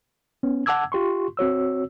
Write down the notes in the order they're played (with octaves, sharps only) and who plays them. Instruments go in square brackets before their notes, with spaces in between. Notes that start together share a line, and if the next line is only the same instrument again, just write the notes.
[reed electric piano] B3 C#4
F#5 A5 D6 E6 G#6
F4 G4 C6 C#6
C4 F#4 C#5 E6